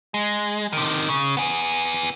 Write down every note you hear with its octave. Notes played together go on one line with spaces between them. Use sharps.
G#3
C3 D#3
C#3
B3 G#4